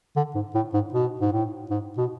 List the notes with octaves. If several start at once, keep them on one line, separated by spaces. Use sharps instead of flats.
D3
G#2
A2
G#2
B2
G#2
A2
G#2
B2